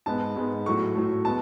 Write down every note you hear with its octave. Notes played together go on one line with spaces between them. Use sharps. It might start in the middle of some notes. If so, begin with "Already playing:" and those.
G#2 G#3 B3 A5
G#2 G#3 B3
A2 F#3 A3 C#6
A2 F#3 A3
G#3 B3 A5